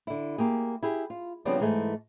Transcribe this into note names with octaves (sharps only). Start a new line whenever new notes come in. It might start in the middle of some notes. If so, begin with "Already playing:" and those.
D3 E4
A#3 G4 G#4
E4 G4 G#4
F4
C#3 F3 G3 B3 C4 D4
G#2 E3 G#3 A3